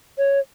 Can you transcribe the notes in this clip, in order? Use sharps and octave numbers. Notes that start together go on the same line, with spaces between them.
C#5